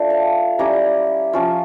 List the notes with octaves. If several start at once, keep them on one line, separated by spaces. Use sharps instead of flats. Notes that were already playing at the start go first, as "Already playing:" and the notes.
Already playing: A3 D4 F4
F5 A5
G3 C#4 E4 A#5 D6
F3 C#4 F4